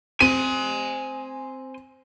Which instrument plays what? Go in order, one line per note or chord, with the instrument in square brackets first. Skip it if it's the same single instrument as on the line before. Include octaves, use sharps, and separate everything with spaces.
[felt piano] C4 [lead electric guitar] G#5 C6 [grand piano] D#7